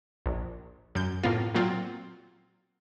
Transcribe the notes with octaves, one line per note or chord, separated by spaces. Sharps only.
A#1
F#2 G6
A2 A#3 B3 F4
A#2 F#3 C4 F4